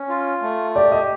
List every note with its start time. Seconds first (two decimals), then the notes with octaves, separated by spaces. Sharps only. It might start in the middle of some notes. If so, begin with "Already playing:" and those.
Already playing: C#4
0.09 F4
0.42 A3
0.75 G4 D5
0.92 D#5